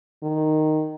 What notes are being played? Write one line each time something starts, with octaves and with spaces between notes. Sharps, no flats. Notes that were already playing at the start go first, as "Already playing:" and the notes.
D#3